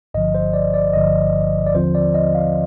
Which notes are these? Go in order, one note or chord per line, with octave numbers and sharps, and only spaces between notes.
G1 G2 D3 F3 D#5
C5
D5
D5
G1 G2 D3 F3 D#5
D5
D#2 D3 F3 C4 F4 C5
D5
D#5
F5